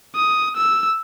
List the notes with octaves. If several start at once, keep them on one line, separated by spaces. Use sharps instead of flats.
D#6
E6